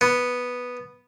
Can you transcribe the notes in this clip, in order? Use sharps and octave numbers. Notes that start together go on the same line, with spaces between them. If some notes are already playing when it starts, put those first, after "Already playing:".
B3